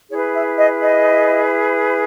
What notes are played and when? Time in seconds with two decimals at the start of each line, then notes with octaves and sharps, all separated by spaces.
0.10 E4 G#4 B4 C#5
0.34 E5
0.58 D#5
0.81 D#5